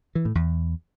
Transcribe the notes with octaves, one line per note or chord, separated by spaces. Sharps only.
E3
A2
E2